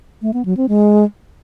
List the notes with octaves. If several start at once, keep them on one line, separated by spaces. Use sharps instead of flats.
A3
B3
F#3
C4
G#3